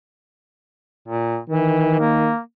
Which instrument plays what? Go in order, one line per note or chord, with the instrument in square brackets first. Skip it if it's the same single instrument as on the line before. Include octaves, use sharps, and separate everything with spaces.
[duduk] A#2
[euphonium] D#3 [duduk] E3
[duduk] A#3